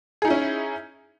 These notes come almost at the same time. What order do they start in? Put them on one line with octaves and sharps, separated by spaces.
G#4 D#4 E4 C#4